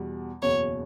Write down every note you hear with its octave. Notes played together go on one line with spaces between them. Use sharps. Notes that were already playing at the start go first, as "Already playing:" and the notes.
Already playing: E2 B2 G3
F#1 E2 B2 C#5